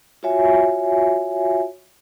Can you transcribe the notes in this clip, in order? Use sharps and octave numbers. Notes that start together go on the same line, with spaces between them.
F4 F#4 C#5 E5 G#5